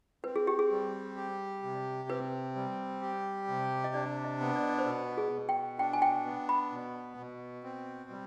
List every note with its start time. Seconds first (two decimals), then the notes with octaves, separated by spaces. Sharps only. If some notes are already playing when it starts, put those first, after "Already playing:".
0.24 C4 B4
0.36 G#4
0.47 G4
0.59 G#4
0.71 G3
1.16 G4
1.63 C3
2.09 C4 B4
2.55 G3
3.01 G4
3.48 C3
3.84 D#5
3.94 D4 D5
4.25 D#5
4.40 B3
4.56 D5
4.63 D#5
4.69 D5
4.78 C5
4.86 B2 B4
5.17 G#4
5.33 B2
5.49 G5
5.79 D4 G5
5.93 G#5
6.02 G5
6.25 B3
6.49 B5
6.71 B2
7.17 B2
7.64 C4
8.10 G3